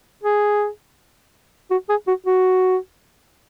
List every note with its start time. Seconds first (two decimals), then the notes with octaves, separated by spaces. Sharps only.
0.23 G#4
1.71 F#4
1.89 G#4
2.07 F#4
2.26 F#4